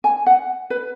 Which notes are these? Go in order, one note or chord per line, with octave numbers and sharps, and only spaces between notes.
G#5
F#5
B4